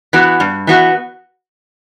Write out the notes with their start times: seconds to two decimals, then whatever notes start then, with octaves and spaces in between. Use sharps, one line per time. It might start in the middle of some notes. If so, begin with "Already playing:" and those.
0.13 E3 B3 F#4
0.40 G2
0.67 E3 B3 F#4